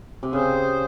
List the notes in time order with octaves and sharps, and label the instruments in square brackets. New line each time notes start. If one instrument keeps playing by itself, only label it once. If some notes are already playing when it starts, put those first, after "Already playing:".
[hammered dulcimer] C3
[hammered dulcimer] C#3 [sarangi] C5